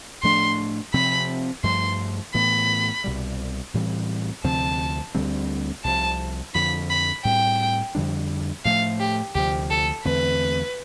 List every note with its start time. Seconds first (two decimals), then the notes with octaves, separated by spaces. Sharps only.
0.23 A2 F3 A3 D4 C6
0.94 C3 F3 C4 B5
1.63 G2 F3 A3 C6
2.34 A2 E3 B3 B5
3.04 C2 B2 G3
3.74 A2 E3 G3 C4
4.44 D2 C3 F3 C4 A5
5.15 D2 D3 G3 C4
5.84 C2 C3 F3 A5
6.54 F2 D3 F3 B5
6.90 B5
7.24 A2 G3 C4 G5
7.95 F2 D3 G3 D4
8.65 A2 F3 A3 F5
9.00 G4
9.35 D2 C3 F3 G4
9.70 A4
10.05 E2 D3 A3 C4 B4